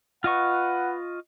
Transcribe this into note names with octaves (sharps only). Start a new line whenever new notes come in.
F4 B4 D#5 F#5 C#6